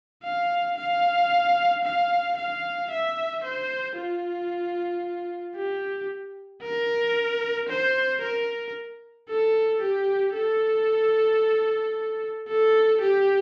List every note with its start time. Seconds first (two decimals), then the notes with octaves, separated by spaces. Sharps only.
0.24 F5
0.78 F5
1.84 F5
2.37 F5
2.91 E5
3.44 C5
3.97 F4
5.56 G4
6.63 A#4
7.69 C5
8.22 A#4
9.29 A4
9.82 G4
10.35 A4
12.48 A4
13.01 G4